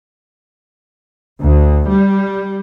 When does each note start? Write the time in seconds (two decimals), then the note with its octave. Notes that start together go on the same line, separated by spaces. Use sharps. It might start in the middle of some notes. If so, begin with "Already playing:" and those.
1.42 D2
1.90 G3